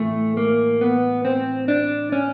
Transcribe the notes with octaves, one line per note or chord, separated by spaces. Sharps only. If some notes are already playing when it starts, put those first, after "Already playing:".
Already playing: A2 E3 A3
A#3
B3
C4
D4
C#4